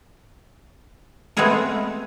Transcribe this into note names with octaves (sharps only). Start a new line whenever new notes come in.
G#3 A3 B3 C4 G#4 A#4